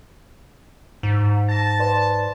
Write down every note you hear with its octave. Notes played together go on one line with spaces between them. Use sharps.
G#2
A5 A6 A#6
B4 D5 C6